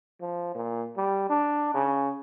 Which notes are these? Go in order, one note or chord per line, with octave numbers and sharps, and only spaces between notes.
F3
A#2
G3
D4
C#3